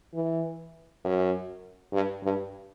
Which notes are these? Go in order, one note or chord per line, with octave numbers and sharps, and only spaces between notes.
E3
F#2
G2
G2